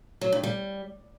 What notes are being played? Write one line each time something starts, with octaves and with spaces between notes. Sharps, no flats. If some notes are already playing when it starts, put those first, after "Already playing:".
F#3
G2
G3